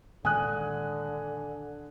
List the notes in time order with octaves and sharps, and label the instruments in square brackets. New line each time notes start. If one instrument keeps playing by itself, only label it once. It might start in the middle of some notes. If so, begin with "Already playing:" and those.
[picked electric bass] A#2 D#3 G#3 [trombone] D3 [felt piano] G#5 D#6 F#6